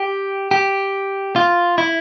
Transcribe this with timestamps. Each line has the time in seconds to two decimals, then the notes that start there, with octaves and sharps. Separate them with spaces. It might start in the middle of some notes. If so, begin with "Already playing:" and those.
Already playing: G4
0.51 G4
1.36 F4
1.78 E4